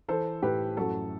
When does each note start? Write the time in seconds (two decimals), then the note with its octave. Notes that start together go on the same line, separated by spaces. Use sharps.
0.08 E3 A4 C5
0.42 A2 G4 B4
0.77 F#2 F#4 A4